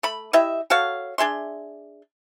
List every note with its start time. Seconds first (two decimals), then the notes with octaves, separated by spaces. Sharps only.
0.03 A3 B5
0.33 E4 G4 D#5 E5
0.70 F#4 A4 C#5 F5
1.18 D4 G#4 E5 C6